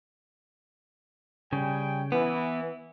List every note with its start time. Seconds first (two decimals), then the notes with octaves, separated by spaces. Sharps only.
1.53 C#3 G3 G5 G#5
2.12 E3 B3